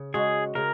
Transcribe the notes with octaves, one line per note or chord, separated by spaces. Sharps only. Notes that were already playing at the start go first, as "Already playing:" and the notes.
Already playing: C#3
G#3 C#4 F#4 G#4
C#3 A#4